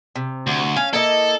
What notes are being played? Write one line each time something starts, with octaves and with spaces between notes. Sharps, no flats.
C3
D2
C#4 F5
A#3 E4 A4 D#5